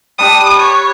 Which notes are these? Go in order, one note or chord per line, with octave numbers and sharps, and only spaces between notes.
G3 D4 D#6
C#5